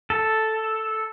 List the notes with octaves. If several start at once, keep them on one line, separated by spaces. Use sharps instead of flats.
A4